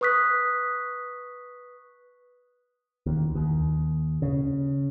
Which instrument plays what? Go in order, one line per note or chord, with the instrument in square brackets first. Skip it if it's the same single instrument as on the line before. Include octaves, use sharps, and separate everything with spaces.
[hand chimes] B4 C#6 D#6 F#6 B6
[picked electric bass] D#2
D#2
C#3